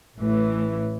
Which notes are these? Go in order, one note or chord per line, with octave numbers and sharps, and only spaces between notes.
A1 A2 E3